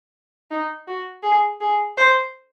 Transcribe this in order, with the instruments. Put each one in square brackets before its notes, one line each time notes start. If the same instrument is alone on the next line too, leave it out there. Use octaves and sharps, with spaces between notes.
[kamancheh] D#4
F#4
G#4
G#4
C5